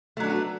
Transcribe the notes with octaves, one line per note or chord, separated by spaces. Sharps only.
F#3 A3 B3 D4 F#4